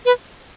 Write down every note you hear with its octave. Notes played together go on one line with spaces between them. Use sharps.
B4